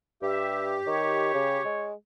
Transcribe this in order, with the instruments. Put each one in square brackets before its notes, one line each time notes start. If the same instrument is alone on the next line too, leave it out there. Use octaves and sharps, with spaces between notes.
[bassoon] G2 [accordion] G4 [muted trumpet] E5
[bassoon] D#3 [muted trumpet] C#5
[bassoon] C#3
G#3